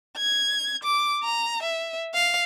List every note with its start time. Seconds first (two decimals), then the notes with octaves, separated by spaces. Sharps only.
0.17 G#6
0.84 D6
1.24 A#5
1.63 E5
2.15 F5